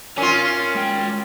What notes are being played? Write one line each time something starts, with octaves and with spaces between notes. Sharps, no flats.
C#4 F4 A#4 G#5
G#3 G5